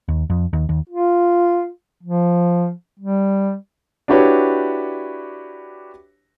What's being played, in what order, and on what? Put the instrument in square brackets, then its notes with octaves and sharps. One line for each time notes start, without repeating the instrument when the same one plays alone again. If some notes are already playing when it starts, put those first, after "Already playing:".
[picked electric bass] D#2
F2
D#2
D#2
[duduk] F4
F3
G3
[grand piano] D4 E4 F#4 G4 B4 C#5